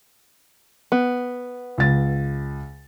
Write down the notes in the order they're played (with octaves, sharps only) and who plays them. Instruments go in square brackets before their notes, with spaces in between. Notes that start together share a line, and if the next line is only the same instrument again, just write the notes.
[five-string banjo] B3
[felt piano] C#2 A6